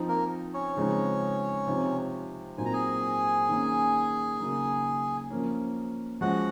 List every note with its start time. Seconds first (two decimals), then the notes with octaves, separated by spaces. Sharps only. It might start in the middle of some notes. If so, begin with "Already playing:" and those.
Already playing: F3 C4 D#4
0.08 A#3 A#4
0.54 C#4 C#5
0.77 C#3 F3 G#3 C4 D#4
1.67 C3 F3 C4 D#4
2.58 A#2 F#3 C4 D#4 G#5
2.65 A#5
2.73 G#4 G#5
3.49 D#3 A#3 C#4
4.39 C#3 F#3 A#3 D#4
5.30 F3 A#3 C#4
6.21 F3 G#3 C#4 F#4 F#5